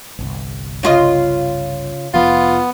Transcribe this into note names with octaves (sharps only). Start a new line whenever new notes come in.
G1 C2
C#3 F4 D#5
F1 F3 B3 F4